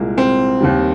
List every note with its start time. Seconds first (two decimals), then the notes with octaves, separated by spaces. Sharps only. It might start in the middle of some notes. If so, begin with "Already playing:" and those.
Already playing: C2 A#2 G#3 A#3
0.18 C4
0.61 D#2 D#3 G3